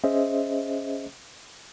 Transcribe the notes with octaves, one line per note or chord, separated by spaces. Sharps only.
C#4 G#4 C5 D#5 E5